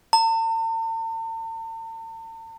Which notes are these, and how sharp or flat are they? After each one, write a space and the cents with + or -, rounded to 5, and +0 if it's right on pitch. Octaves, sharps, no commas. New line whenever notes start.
A5 +45